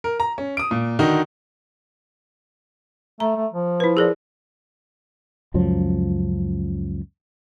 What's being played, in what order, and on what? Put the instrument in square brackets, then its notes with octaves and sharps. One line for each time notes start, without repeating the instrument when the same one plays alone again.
[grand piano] A#4
A#5
C#4
D#6 D7
A#2
D3 D#3 D#4 F#4
[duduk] A3 [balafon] A#5
[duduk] A3
F3
[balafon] E4 B4
G#4 A#4 D5
[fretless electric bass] C#2 F#2 F3 F#3